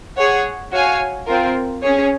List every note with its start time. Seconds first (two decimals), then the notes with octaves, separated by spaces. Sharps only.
0.17 G#4 C#5 F#5
0.72 F#4 C#5 F5 G#5
1.27 C4 F4 A#4
1.83 C#4 G#4 C#5